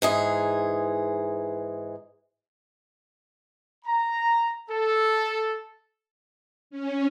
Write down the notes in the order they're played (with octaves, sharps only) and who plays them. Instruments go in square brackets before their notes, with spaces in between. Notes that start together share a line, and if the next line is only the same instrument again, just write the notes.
[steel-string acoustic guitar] G#2 E3 G#4
[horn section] A#5
A4
[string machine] C#4